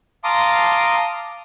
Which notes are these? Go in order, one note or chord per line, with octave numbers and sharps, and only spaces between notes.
F5 A5 A#5 C6 D6 D#6